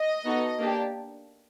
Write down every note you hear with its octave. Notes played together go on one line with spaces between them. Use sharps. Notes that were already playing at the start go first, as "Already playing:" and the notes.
Already playing: D#5
B3 D#4 F#4 A4
A#3 D4 G4